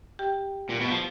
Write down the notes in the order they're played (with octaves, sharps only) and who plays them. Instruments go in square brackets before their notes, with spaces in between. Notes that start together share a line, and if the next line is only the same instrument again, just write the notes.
[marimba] G4 G5
[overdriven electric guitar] A#2
B2
F3